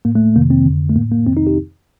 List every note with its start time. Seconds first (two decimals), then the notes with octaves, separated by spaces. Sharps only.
0.05 A2 A#3
0.15 A3
0.36 F2 C3 D#3 A#3
0.50 C4
0.66 F2 D3
0.90 A3
0.96 A2 A#3
1.12 A#3
1.26 F2 C3 D#3 C4
1.37 D#4
1.47 G4